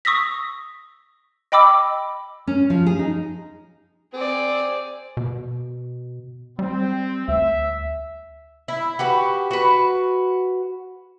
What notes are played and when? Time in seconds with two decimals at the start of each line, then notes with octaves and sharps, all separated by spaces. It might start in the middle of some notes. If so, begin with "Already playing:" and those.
0.05 C#6 D#6 E6 A#6 B6
1.52 D#5 G5 B5 D6 E6
2.47 C#4
2.70 F3
2.86 G#4
2.99 D#4
4.14 C4 G#4 D5
5.17 B2
6.59 G3 C4
7.28 D2 E5
8.68 E4
8.99 F#4 G4 B4
9.51 F#4 B4